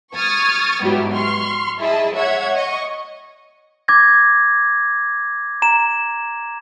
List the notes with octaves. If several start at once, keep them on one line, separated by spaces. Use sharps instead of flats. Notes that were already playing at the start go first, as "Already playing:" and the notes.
C#6 D#6 F6 G#6 A6
G#2 B2 F#3 G3 E4 G4
C6 C#6 F6
E4 G#4 D#5 A5
C#5 E5 F#5 G#6
D#5 C#6
D6 G#6 A#6
A#5 E7